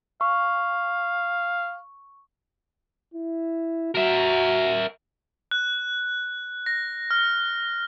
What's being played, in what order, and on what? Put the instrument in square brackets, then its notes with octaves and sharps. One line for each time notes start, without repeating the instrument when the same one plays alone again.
[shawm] F5 [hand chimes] C#6
[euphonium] E4
[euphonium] F#4 [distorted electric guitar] A#4 E5
[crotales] F#6
A#6
F6